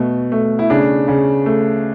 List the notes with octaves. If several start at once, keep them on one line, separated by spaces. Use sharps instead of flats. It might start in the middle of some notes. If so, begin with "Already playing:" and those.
Already playing: B2 A3
A3
E4
C#3 D4
C#3
A3